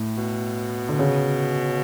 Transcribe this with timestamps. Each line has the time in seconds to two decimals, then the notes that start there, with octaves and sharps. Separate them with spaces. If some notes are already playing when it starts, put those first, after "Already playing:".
Already playing: A2
0.17 B2
0.89 D3
0.99 C#3